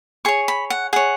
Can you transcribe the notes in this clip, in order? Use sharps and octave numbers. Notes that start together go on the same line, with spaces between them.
G#4 C#5 C#6
B5
F#5
G#4 C#5 F#5